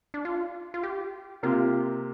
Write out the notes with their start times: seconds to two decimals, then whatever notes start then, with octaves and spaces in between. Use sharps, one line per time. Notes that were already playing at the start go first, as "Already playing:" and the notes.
0.14 D4
0.25 F4
0.74 F4
0.83 G4
1.43 C3 A#3 F4 G4